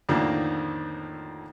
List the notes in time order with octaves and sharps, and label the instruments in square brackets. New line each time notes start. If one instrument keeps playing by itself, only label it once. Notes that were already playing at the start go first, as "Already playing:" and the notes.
[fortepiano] F2 A2 D3 D#3 F3 A#3